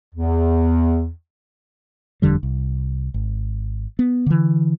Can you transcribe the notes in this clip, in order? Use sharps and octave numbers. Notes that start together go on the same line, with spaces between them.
E2
F#1 F2 D3 G3
C2
G#1
B3
D3 E3